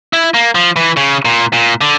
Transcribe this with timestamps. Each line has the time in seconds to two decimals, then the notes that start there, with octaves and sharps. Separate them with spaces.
0.13 E4
0.34 A#3
0.55 F3
0.76 E3
0.97 C#3
1.25 A#2
1.53 A#2
1.81 D3